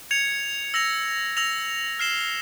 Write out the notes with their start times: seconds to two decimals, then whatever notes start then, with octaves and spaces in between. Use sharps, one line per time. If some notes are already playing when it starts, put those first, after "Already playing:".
0.11 G#6 C#7 F7
0.74 E6 A#6 F7
1.37 E6 A#6 F7
1.99 F6 C7 E7 G7